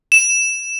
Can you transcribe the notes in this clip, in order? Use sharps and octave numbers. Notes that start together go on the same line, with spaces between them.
E7